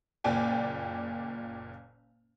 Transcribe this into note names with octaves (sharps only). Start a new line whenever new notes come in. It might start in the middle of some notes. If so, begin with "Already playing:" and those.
F#1 A#2 D5 G5 G#5